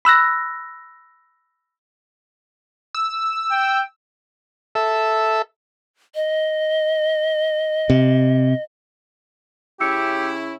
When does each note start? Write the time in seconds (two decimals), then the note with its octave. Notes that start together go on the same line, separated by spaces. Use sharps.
0.05 B5 E6 F#6 A#6
2.95 E6
3.51 G5
4.75 A4 E5
6.15 D#5
7.90 C3
9.80 C#3 C#4 E4 G4 E6 C#7